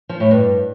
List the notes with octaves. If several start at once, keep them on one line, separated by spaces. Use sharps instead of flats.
F3
A2
G2